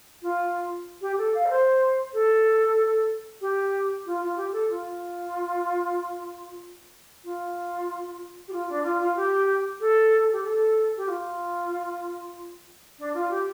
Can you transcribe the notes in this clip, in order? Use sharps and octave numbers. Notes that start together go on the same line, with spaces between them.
F4
G4
A4
F5
A4
C5
A4
G4
F4
F4
G4
A4
F4
F4
G4
F4
D4
F4
F4
G4
A4
G4
A4
G4
F4
D4
F4
G4